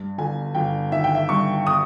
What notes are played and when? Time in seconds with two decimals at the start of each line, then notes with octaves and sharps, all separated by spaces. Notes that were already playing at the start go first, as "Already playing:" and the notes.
Already playing: G2
0.18 G1 G#5
0.55 G1 G5
0.92 D#3 E5
1.04 G5
1.15 E5
1.29 G2 C#6
1.67 D#6